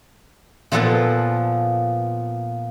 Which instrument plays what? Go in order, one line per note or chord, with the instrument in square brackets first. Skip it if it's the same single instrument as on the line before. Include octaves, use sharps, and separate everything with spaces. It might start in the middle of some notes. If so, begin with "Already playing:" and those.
[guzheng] A#2 F3 B3 A4 F#5